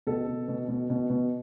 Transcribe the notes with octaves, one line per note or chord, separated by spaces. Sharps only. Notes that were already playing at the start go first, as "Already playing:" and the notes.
B2 A4
B2
B2
B2
B2
B2